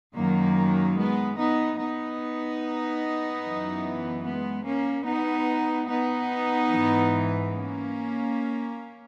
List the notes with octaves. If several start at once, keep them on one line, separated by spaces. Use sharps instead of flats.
F#2 D#3 F#3 A#3
G#3 B3
B3 D#4
B3 D#4
F#2 E3
G#3 B3
A#3 C#4
B3 D#4
B3 D#4
G#2 E3
A#3 C#4